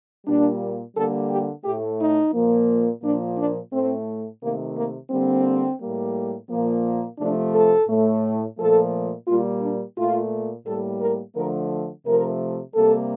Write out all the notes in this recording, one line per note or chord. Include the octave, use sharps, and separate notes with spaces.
A#2 G3 A#3 D4
D3 G3 A#3 A4
G4
A2 A3 G4
D#4
A#2 F3 A#3
A#2 F3 A#3 D4
D4
A2 A3 C4
C3 D#3 A3 A#3
A#3
D3 G3 A#3 C4
A2 G3 A#3
A#2 F3 A#3
C3 F3 A3 D4
A4
A2 A3
A#2 F3 A3 A4
A#2 G3 A#3 F4
D4
A#2 A3 F4
A2 G3 A#3 A4
A#4
D3 F3 A3 A#4
C3 F3 A3 A#4
C3 G3 A#3 A4